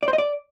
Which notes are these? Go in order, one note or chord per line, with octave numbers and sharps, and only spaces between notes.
D5
C5
D#5
D5